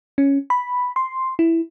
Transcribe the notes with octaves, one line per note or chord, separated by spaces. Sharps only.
C#4
B5
C6
E4